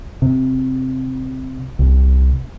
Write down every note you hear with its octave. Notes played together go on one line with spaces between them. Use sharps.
C3
C2